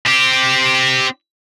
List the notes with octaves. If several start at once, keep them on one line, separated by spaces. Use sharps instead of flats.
C4 G4